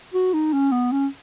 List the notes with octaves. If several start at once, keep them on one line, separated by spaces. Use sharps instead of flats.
F#4
D#4
C#4
B3
C#4